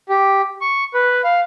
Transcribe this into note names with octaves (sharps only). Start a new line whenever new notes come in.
G4
C#6
B4
F5